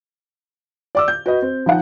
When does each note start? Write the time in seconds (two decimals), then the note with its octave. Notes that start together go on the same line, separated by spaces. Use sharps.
0.95 D5 D6 E6
1.08 G6
1.26 F#4 B4 D#5
1.42 C4
1.66 F3 D#4 F#5